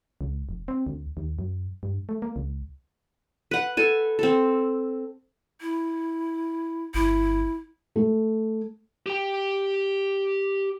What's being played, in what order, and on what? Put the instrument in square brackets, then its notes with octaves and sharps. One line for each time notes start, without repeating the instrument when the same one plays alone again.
[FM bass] C#2
F1
C4
D2
D#2
F#2
G2
A3
A#3
C#2
[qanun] B4 F#5
A4 G#5
C4 A4
[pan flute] E4
[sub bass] G1 [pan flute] E4
[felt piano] A3
[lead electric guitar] G4 G5